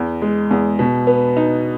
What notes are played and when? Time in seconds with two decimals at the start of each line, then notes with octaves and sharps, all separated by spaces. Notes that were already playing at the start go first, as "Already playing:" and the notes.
Already playing: E2
0.22 G#3
0.51 E2
0.79 B2
1.07 B3
1.37 D#4